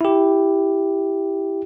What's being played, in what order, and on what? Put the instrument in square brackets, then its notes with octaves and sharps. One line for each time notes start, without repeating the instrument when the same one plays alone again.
[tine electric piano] E4 G4